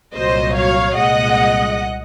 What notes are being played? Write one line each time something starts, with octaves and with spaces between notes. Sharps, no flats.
C2 A#2 F#3 C5 D#5
C#5 F5
C2 A#2 G#3 D#5 F#5